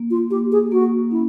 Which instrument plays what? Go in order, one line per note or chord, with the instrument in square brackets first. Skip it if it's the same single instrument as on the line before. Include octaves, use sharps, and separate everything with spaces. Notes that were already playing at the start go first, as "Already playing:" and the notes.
Already playing: [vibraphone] A#3
[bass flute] F4
[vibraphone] A#3 [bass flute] G4
[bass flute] G#4
[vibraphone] A#3 [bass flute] F#4
[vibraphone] C#4 [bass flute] E4